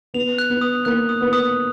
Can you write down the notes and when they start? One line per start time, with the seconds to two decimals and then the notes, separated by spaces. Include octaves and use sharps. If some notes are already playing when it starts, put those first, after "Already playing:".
0.14 B3 F7
0.38 F#6
0.50 B3
0.61 D#6
0.85 A#3 F#6
1.09 D#6
1.21 B3
1.33 D#6